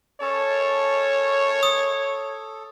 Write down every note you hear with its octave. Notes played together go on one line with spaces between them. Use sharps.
C#4 A4 C#5 A5
A4 D#6